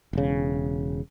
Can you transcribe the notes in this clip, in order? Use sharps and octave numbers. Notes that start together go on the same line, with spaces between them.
E1 C#3